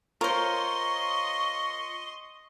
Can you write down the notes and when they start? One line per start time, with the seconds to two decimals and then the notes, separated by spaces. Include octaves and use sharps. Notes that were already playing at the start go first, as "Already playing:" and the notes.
0.21 F4 A#4 C5 C#5 D#5 C6 C#6